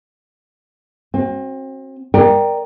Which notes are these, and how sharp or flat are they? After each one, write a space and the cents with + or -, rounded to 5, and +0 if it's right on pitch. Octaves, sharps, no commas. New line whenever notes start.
C4 +35 F#4 +0
A#4 +10 D5 +30 G5 +0